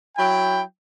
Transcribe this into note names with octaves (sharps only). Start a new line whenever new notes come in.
F#3 E4 G5